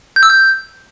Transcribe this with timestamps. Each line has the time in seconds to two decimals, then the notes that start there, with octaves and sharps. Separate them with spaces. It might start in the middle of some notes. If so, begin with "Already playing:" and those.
0.16 G6
0.23 E6
0.29 G6